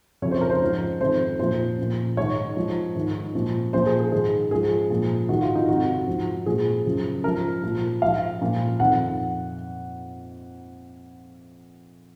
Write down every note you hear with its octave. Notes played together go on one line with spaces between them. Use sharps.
F2 C#3 F3 C#5
C5
A#4
C5
G#2 F3
F2 D#3 C5
A#2 F3 C5
A#2 F3
G#2 D#3 C#5
G#2 F3
G#2 D#3
A#2 F3
A#2 F3 C5
G#4
G#4
G#2 D#3 G#4
G#2 F3 G#4
A#2 F3
G#2 D#3 F#4
F4
D#4
F2 C3 D#3 F#4
G#2 F3
A#2 F3 G#4
F#2 C#3 F3
G#2 F3 A#4
A#2 F3
G#2 F3 F5
A#2 F3
F2 D#3 F#5